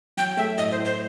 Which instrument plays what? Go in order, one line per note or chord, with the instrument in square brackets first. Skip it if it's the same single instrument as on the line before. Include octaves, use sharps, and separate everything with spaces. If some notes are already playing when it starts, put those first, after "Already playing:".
[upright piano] F#3 [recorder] G5
[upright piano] A3 [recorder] E5
[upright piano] A2 [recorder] D#5
[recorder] C5
[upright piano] A2
[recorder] C5